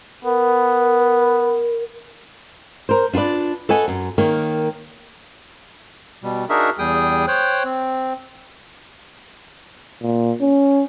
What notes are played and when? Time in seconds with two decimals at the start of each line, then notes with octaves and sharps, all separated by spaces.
0.25 B3 A#4
2.89 A#4 C5
3.13 D4 F4 F#4 B4 D5
3.69 A4 B4 C#5 D#5 F#5 G#5
3.88 F#2
4.18 D#3 A#3 C#5
6.23 B2 G3
6.49 D4 D#4 F#4 G#4 A#4 E5
6.79 E2 G3 G#4 G5 D#6
7.28 C5 C#5 G5 F#6
7.65 C4
10.02 A#2
10.41 C#4